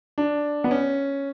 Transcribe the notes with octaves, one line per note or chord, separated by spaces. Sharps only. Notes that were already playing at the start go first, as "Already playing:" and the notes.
D4
B3
C#4